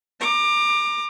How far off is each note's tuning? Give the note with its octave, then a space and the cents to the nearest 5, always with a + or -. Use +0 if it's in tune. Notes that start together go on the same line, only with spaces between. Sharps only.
A#5 +5 D6 +25